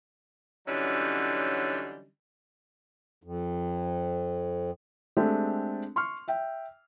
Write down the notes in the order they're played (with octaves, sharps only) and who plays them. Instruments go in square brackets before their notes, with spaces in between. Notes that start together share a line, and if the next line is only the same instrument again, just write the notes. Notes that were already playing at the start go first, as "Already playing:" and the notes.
[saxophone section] D3 E3 F#3 G3 C#4 D#4
[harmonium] F2
[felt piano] G#3 A3 C4 D4 G4 A4
C6 C#6 F6
E5 G5